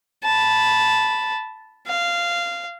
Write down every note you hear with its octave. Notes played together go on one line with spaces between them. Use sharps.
A5 B5
F5